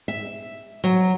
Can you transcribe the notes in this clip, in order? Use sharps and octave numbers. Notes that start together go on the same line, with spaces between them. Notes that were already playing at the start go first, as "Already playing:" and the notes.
E5
F#3